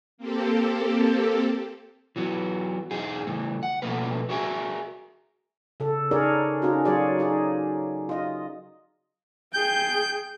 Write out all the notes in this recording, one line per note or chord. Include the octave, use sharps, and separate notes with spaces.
A#3 C4 G4 A4
E3 F#3 B3
E2 D#4 G#4
C#3 E3 A3
F#5
B2 F3 A3 A#3 B4
F#4 G#4 A#4 E5 G#5
C#3 A4
D4 D#4 G#4 A#4 C#5 D5
C#4 D#4 F4 F#4
F#3 F4 F#4 G#4 C#5 D5
D#4 G#4 D5
F4 D#5
G#4 G5 G6